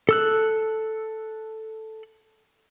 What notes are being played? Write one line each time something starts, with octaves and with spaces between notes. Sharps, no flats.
A4 E6 F#6